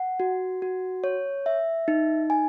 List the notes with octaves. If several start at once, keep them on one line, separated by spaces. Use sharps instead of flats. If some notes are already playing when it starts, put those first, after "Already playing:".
Already playing: F#5
F#4
F#4
C#5
E5
D#4
G#5